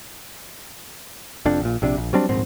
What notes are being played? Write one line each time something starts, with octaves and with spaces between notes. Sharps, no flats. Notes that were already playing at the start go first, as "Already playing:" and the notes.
F1 F2 D4
A#1 A#2
A#1 C3 D4
A#1
F#3 G3 C4 D4
D#1 A#1 G#2 C4